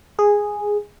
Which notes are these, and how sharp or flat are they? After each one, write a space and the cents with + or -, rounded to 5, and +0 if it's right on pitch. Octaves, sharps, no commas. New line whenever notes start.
G#4 -5